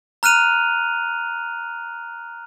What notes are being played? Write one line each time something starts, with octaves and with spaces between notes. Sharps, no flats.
A#5 F6 F#6 D#7 F7